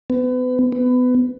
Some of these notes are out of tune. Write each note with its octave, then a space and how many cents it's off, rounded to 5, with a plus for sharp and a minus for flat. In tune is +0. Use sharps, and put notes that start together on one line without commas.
B3 +35
B3 +25